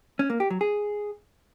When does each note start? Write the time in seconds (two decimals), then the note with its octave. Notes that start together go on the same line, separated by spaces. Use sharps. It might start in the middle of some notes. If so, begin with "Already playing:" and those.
0.19 C#4
0.30 A#3
0.40 G4
0.50 F#3
0.61 G#4